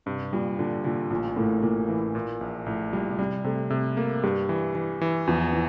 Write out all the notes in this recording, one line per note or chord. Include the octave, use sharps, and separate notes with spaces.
G2 C3
A#2 G3
A#2 D3
A#2 D3
A1 A#2
A2 A#3
A#2 A#3
E3
A#2
A#1
A#1 A2
A#2 G3
A#2
C3 G3
C3 A3
C3 A3
A3 A#3
G2 G3
E3
E3
E3
E2 F3
E3